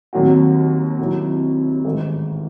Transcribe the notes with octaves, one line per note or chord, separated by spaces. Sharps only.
D#2 D#3 F#3 C4 F#4
C3 D#3 F#3 C4 E4
A1 G#2 D#3